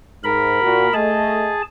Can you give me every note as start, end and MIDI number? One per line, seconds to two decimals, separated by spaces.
0.24 0.57 44
0.24 0.93 70
0.24 0.93 83
0.62 0.87 46
0.62 0.87 66
0.93 1.52 57
0.93 1.62 68
0.93 1.52 75
0.93 1.62 81